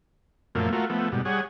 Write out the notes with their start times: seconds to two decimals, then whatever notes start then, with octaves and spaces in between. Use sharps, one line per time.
0.55 F#2 A#2 F3 A3 A#3
0.73 A3 F4 F#4 A#4
0.90 F3 A3 B3
1.12 G#2 B2 G3
1.25 G3 G#4 C#5 F#5